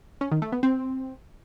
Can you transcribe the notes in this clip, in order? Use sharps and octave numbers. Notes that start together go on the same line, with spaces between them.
C#4
D#3
A3
B3
C4